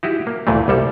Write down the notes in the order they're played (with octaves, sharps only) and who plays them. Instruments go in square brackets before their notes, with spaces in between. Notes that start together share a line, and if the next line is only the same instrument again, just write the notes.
[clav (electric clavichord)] D#4 E4 F#4 G4
A#3
D2 A#2 E3 A3
C2 G3 A4